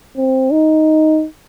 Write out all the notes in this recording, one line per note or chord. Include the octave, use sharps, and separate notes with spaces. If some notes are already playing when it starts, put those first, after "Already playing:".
C4
D#4